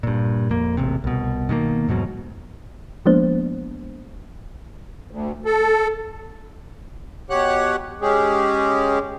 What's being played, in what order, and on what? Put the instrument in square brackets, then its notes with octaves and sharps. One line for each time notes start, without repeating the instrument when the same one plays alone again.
[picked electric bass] G2 A#2
F2 A#3
E1 A1 C3
C2 B2
B2 D#3 F#3 A#3
E2 G#2 B2 F#3
[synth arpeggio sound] F3 G#3 A#3 B3 D4 C5
[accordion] D2
A4
B2 G4 C#5 F#5 F#6
G#3 C#4 G4 G#4